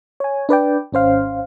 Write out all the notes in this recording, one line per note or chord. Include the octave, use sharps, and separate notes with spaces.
C#5 G#5
D4 B4 D5 G5
G#1 C#4 C5 F5